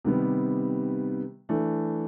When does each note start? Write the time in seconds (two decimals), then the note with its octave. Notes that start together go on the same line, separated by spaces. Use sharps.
0.05 C3 D#3 G3 B3
1.49 E3 A3 D4